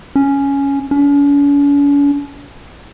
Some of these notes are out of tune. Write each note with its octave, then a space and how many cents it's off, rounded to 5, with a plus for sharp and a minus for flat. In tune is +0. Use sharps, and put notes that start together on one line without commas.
C#4 +5
C#4 +45